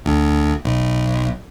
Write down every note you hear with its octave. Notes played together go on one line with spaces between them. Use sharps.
D2
B1